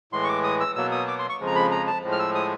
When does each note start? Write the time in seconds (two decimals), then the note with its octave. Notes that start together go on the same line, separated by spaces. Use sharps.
0.12 A2 E3 G#3 C6
0.24 C#6
0.28 D6
0.44 D#6
0.60 E6
0.76 B2 F#3 A#3 E6
0.92 D#6
1.08 D6
1.19 C6
1.29 C#6
1.40 F2 C#3 F3 G#3
1.47 A#5
1.55 B5
1.71 A#5
1.87 A5
2.03 A2 F3 G#3
2.12 F6
2.19 E6
2.35 D#6